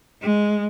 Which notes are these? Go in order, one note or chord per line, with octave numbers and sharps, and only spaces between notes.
G#3